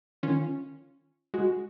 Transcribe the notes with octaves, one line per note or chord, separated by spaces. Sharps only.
D#3 C#4 F4
G#3 F#4